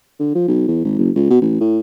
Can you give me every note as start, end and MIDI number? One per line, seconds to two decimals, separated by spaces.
0.20 0.30 50
0.35 0.47 53
0.48 0.65 35
0.68 0.80 40
0.84 0.96 32
0.98 1.10 30
1.16 1.30 37
1.30 1.38 47
1.41 1.56 33
1.61 1.79 45